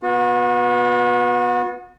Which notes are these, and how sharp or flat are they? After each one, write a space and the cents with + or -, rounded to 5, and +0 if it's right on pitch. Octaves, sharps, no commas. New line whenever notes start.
B3 -10 F#4 -40